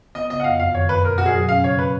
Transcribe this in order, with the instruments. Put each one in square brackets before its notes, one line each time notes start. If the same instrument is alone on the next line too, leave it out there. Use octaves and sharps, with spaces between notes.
[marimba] B3 [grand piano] D#5
[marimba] C#3 [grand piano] D#5
[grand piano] F#5
[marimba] F2 [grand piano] F5
[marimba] F#2 [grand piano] F5
[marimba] D#3 [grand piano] C#5
[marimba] F#2 [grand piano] B4
[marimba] B2 [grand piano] A#4
[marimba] F#3 [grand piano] F#4
[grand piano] G#4
[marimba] B2
[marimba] C#4 [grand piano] F5
[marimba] C#3 [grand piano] C#5
[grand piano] B4